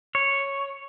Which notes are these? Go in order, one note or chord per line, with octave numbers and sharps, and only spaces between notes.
C#5